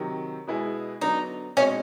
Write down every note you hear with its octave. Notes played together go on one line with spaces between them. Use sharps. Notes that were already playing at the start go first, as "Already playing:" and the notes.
Already playing: C3 D#3 F#3
B2 G#3 B3 E4 G#4
D3 F#3 B3 D4 D#4
B2 G#3 C4 C#4 D#4